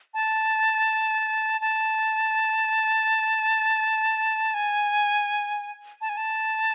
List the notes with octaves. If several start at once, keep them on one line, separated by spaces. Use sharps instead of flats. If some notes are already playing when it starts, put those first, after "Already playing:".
A5
A5
G#5
A5
G#5
A5